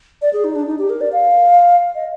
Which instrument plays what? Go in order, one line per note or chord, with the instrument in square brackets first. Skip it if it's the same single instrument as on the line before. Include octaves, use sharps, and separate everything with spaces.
[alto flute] D5
G#4
D#4
D4
D#4
G4
A#4
D5
F5
D#5